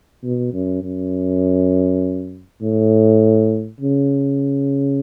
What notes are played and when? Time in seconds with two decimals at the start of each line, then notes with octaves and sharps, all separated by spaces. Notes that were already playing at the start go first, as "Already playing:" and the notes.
0.23 B2
0.53 F#2
0.83 F#2
2.61 A2
3.81 C#3